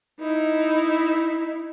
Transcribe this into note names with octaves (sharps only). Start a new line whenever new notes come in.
D#4 E4